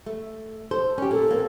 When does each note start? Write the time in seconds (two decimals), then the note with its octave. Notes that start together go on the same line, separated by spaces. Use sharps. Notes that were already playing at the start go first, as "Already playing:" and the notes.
0.06 A3
0.71 A4 C5
0.98 C#4 G4
1.11 A#2 A4
1.31 A#3 C4